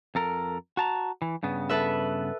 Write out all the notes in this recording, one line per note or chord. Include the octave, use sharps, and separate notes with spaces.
F2 A4 A#4
F#4 A5 A#5
E3
G2 C#3 B3
A4 B4 E5